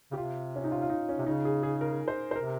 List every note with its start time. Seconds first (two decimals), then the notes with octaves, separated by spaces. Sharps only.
0.11 C#3 G4
0.17 C3 F4
0.56 C#4
0.64 D#4
0.72 F4
0.82 F4
0.89 D#4
1.09 C#4
1.18 C3
1.26 C#3 D#4
1.45 G#4
1.63 G#4
1.81 A#4
2.08 C5
2.31 C5
2.35 C3 A#4